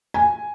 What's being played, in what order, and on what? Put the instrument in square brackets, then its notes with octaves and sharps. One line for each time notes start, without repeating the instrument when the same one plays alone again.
[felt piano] G#5